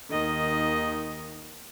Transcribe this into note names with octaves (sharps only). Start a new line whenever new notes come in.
D#2 D#3 D#5